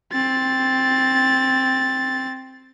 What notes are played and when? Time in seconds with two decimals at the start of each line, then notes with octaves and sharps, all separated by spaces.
0.12 C4 A6